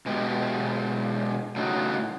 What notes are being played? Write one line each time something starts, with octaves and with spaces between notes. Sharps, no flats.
B2 G#3 B3 G4
A2 C#3 G3 D#4 F#4